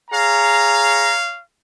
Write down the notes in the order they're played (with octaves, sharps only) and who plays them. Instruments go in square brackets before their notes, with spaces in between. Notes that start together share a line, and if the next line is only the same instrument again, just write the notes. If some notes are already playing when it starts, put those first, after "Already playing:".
[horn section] G#4 A#5 [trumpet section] C#5 F5